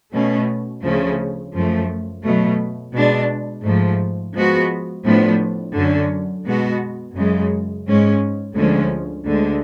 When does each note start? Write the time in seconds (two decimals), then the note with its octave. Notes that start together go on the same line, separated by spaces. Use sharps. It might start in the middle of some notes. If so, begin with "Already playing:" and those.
0.13 B2 A3 C#4
0.84 D2 C#3 F3 A3 C#4
1.53 F#2 F3 A3
2.24 B2 F#3 A3
2.95 B2 G#3 D4
3.64 G#2 F3 A3
4.35 F3 G#3 B3 F#4
5.05 A2 F3 B3 D4
5.75 F#2 D3 F#3 C#4
6.45 B2 G#3 B3 F#4
7.16 F#2 C#3 G#3
7.86 G#2 G#3 C#4
8.56 D2 D3 F3 G#3 C#4
9.26 D2 D3 G#3